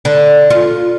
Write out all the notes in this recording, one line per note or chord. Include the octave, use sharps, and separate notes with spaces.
D3
F4